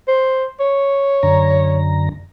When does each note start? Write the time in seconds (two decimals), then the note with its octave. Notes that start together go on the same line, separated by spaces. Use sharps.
0.08 C5
0.60 C#5
1.23 F#2 D3 A#5